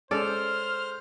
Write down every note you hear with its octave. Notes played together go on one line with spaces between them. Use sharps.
G#3 C#4 A4 C5 D5 F6